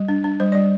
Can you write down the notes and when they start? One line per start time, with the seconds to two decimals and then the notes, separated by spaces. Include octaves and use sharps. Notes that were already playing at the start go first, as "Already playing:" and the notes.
Already playing: G3
0.08 D4
0.24 D4
0.40 G3 C5
0.52 D5
0.55 G3